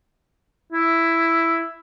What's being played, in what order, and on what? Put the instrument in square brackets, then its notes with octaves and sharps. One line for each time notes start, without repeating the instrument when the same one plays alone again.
[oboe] E4